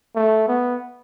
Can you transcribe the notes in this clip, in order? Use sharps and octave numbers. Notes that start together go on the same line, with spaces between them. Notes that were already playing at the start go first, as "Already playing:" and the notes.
A3
B3